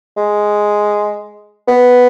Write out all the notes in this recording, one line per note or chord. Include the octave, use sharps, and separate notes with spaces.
G#3
B3